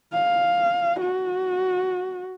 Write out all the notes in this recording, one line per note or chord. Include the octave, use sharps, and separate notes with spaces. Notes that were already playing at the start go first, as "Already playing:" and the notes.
F5
F#4